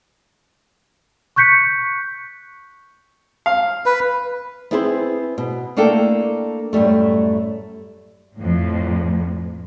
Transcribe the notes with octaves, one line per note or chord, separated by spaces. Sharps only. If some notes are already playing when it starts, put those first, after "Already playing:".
C#6 F#6 G6 B6 C#7
F5
B4
B3 C4 E4 G#4 B4 C5
B2
A3 A#3 D4 E4 A4 G5
F#2 A2 G3 A3
F2 A2